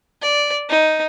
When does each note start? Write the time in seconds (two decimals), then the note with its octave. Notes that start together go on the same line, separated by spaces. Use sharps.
0.22 D5
0.70 D#4